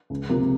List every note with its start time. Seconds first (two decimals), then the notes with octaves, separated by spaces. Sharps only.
0.10 C#2
0.29 C3 F3 A#3